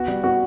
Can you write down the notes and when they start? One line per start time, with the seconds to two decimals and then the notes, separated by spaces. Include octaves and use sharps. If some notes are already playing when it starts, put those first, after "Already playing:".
Already playing: B3 F#4
0.08 G3
0.24 B3 F#4